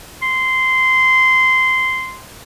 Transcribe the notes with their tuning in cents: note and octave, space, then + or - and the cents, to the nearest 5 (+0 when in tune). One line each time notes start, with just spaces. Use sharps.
C6 -15